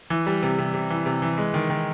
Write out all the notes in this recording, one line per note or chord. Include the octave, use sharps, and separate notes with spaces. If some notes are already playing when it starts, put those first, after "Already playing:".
E3
G3
C3
C3
C3
E3
C3
E3
G#3
D#3
D#3